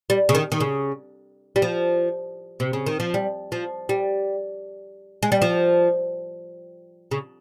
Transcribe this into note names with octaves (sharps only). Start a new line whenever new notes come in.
G3
C#3
D#3
D#3
C#3
G3
F3
C3
C#3
D#3
F3
G3
F3
G3
G#3
G3
F3
C#3